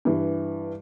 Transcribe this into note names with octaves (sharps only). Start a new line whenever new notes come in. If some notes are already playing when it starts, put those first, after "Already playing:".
G2 E3